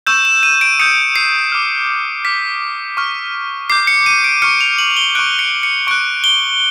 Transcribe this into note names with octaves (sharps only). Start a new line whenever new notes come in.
C#6 E6 G6 E7
E7
D#7
D7
D#6 G6 C#7
C7
D6 F6
D6 F6 B6
C#6 F6
D6 G6 C7
C#7
D#7
D7
C#6 F6 C#7
F7
F#7
G7
C#6 F#6 D7
C#7
C#7
C#6 F#6 D7
G7